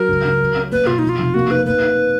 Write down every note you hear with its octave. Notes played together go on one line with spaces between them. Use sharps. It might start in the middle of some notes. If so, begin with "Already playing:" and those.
Already playing: F#3 A#4
C#2
C#2
F#3
C#4
A#3 B4
B2 F4
D#4
F3
F4
F1
A#3 F#4
D#4 B4
A#3 B4
D#4